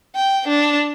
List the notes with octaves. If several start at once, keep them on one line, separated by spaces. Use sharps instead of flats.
G5
D4